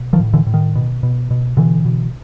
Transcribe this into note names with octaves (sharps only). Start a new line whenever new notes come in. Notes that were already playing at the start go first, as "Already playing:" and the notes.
Already playing: B2
D#3 F3
A2
D3 E3
A2
D#3
B2
B2
B2
B2 D3 E3
B2